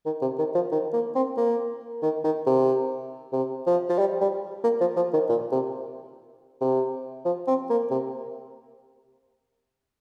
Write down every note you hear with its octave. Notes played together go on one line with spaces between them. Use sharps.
D#3
C3
D#3
F3
D#3
A#3
C4
A#3
D#3
D#3
C3
C3
F3
F3
G3
G3
A#3
F3
F3
D#3
A#2
C3
C3
F3
C4
A#3
C3